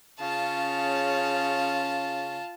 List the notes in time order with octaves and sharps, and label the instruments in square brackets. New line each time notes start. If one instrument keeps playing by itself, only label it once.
[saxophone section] C#3 C#4 [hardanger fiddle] F4 A5